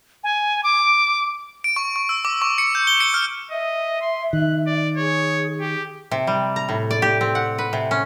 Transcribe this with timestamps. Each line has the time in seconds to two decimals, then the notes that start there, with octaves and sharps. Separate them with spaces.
0.24 G#5
0.64 D6
1.64 D7
1.76 C#6
1.96 C#6
2.09 E6
2.25 D6
2.42 C#6
2.58 C#7
2.75 G6
2.87 G7
3.00 C#7
3.14 F6
3.51 D#5 E5
4.01 C6
4.33 D#3 F#6
4.67 D5
4.97 G#4 C#5
5.60 G4
6.11 C3
6.27 G3
6.56 A#5
6.69 A2
6.91 D5
7.02 G4
7.21 C4
7.35 F#5
7.58 B4
7.73 C3
7.91 C#4